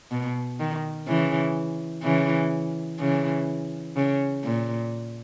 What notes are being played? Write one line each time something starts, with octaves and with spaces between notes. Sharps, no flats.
B2
D#3
C#3 E3
C#3 E3
C#3 E3
C#3
A#2